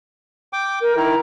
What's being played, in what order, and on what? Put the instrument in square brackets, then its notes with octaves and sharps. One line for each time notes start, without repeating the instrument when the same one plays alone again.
[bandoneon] G5 D6
[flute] A#4
[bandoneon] D#3 E4 [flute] A#5